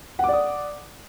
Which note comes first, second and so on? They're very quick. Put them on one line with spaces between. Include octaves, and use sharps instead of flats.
F#5 D6 D5 D#6